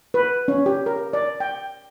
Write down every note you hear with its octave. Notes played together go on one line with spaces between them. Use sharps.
B4
C#4
G4
A#4
D5
G5